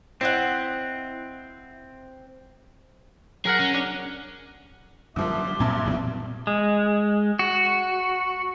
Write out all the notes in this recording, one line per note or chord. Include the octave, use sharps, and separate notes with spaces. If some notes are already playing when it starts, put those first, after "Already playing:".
C4 E4 D#5 F#5
F#3 G#4 A#4 F#5
C#4
D4
F#2 D3 F3 G3 A#3 E5 C6 D6
G2 A#2 C4 A5 G#6
E1 B1 E2 B2 G3 E4
G#3
F#4